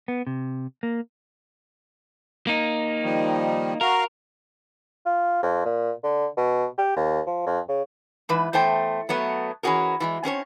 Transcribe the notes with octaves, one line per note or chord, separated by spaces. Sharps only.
B3
C3
A#3
A#3 D#4
D#3 F3 G3
F#4 A#4 F5 A#5
F4
F2
A#2
D3
B2
G4
D#2
F3
F2
C#3
G#2 E3 B4
E2 A3 C5 G5 A5
F#3 A3 B3 C#5
E3 C#4 E4 F#4 G#4 A#4
E3 G3 G#3
C4 C#4 A4 C#5